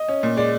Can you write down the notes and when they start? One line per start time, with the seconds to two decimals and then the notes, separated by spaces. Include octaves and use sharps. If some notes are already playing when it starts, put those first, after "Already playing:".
Already playing: D#5
0.08 C#4
0.23 A#2
0.37 G#3 D5